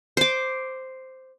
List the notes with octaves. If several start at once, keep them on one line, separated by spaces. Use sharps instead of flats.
C5 D6